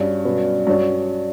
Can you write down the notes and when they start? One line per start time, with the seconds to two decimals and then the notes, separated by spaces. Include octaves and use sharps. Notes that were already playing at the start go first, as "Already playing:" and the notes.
Already playing: G2 G3 C#4 F#4 C#5
0.25 B2 F#3 C#4 F#4 B4
0.67 G2 F#3 C#4 F#4 C#5